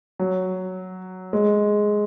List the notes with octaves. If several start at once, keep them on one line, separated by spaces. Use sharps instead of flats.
F#3
G#3